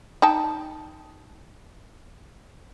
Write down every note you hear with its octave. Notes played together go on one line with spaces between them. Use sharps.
D#4 G5 A5